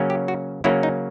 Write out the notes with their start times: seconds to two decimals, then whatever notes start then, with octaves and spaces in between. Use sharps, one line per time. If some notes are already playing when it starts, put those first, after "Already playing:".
Already playing: C#3 F#3 A#3 C#4
0.10 G4
0.28 F#4
0.64 C#3 F#3 A#3 C#4 E4
0.83 D#4